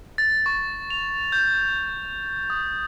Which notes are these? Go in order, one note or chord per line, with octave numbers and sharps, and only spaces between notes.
A6
C#6
F7
G6
D#6